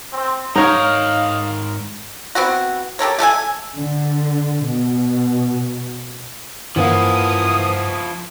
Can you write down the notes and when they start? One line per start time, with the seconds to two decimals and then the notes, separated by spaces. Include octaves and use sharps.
0.13 C4
0.56 G#2 D#4 A#4 C#5 D#5 F5
2.35 B3 C4 E4 F#4
2.99 G4 A4 A#4 C#5
3.19 A3 A4 E5 G#5
3.76 D3
4.64 B2
6.76 G2 E3 F3 A#3 E4 C5 F#5 D#6